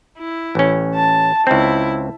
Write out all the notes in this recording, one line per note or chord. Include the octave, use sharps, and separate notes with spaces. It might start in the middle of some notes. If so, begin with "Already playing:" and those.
E4
A1 C#4
A5
C#2 C4 E4